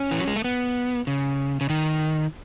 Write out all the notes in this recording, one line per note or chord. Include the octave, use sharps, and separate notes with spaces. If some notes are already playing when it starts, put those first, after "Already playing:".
Already playing: C#4
E3
F#3
G#3
A3
B3
C#3
C#3
D#3